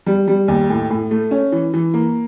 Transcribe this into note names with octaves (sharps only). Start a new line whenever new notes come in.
G3
G3
D#2
A2
A2
A3
C#4
E3
E3
A#3